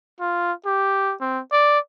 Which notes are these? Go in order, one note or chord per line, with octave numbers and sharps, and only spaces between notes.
F4
G4
C4
D5